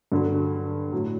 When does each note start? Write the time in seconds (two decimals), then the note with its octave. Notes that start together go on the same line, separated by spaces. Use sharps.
0.12 G2 D3 F#3
0.92 A2 F#3